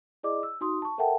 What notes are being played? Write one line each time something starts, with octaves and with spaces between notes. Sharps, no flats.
E4 G#4 D5 D#5 D6
E6
D#4 F#4 C6 D#6
A5 C#6
A4 A#4 E5 F#5 G5 A5